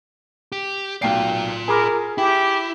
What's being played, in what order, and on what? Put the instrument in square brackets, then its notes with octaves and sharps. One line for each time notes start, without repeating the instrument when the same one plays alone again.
[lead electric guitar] G4
[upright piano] B1 G5 C7 [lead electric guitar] F4 D5
[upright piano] G#4 B5 D6 [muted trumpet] A#4
[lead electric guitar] E4 [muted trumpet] G4